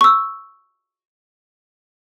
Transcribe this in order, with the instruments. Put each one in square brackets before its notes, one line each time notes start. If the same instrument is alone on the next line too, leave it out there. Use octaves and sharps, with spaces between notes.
[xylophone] C#6 E6